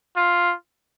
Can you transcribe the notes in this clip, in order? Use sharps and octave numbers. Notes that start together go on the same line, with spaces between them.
F4